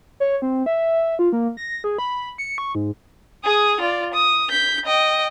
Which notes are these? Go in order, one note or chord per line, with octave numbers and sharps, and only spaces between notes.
C#5
C4
E5
F4
A#3
A#6
G#4
B5
C#7
C#6
G#2
G#4 D#6
F4 D5
D#6
G6 B6
D#5 G5